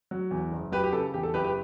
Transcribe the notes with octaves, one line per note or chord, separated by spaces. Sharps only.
F#3
E2
F#1
F#3 G4 B4
G4
C#3 A4
E2 G4
A4
F#1 G4 B4
G4 B4